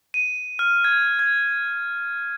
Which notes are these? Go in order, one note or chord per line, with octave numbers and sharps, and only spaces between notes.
D#7
F6
G#6
G#6